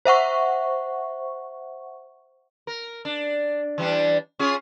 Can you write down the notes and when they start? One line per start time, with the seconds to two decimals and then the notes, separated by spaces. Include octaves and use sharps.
0.05 C5 E5 F#5 C#6
2.67 A#4
3.05 D4
3.78 E3 G3 D4
4.39 C#4 F4 G#4